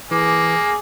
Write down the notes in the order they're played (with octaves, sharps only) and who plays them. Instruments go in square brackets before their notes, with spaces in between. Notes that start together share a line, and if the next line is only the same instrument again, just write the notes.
[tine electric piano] E3 [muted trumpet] A#3 [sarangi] G#4 [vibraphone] D6